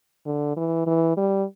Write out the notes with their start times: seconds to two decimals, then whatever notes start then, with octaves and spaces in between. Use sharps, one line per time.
0.26 D3
0.56 E3
0.87 E3
1.17 G3